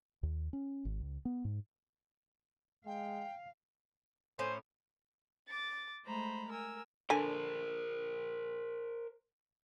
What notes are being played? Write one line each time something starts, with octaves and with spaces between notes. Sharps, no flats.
D#2
C#4
G#1
C#2
B3
G#2
G#3 F5 G5
A2 C#4 C5
D6 A6
G#3 A3 C5 A#5 B5
A#4 G#5 E6
D3 A#4 C5 G#5